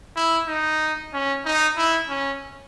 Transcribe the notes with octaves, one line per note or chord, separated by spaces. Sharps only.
E4
D#4
C#4
D#4
E4
C#4